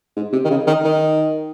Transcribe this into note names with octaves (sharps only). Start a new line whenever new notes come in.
G#2
C3
D#3
C#3
D#3
D#3